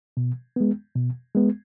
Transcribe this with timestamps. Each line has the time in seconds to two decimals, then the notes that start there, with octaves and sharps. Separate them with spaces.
0.17 B2
0.56 G#3 B3
0.95 B2
1.35 G#3 B3